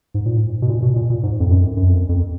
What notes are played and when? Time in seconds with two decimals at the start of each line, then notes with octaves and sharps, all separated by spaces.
0.14 G#2
0.26 A#2
0.37 G#2
0.62 B2
0.69 A#2
0.82 B2
0.96 A#2
1.10 A#2
1.23 G#2
1.40 F2
1.51 F#2
1.77 F#2
1.89 F2
2.09 F2